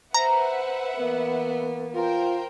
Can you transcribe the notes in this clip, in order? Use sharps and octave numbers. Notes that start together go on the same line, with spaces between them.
B4 C5 E5 F#5 A#5
E3 A#3 B3
F4 A#4 C5 G5